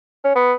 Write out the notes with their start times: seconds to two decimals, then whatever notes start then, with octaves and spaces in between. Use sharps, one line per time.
0.25 C#4
0.35 B3